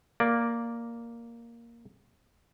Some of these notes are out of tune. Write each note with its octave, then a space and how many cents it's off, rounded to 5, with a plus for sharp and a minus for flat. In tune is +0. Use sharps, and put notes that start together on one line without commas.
A#3 +0 D5 +0